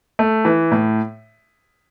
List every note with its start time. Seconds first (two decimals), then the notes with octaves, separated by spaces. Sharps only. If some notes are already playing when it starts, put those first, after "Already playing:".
0.19 A3
0.45 E3
0.71 A2